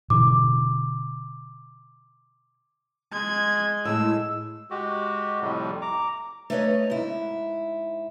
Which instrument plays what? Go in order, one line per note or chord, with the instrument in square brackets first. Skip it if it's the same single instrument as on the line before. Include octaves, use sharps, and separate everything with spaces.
[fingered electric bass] B2 D3 E3 [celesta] D6
[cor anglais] G#3 [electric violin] G#6
[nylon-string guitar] A2 G#3 [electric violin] E6
[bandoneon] G#3 F#4 G4
F2 A2 C3 G3
A#5 D6
[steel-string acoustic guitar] A3 D#4 B4 C#5 D#5
G#2 E4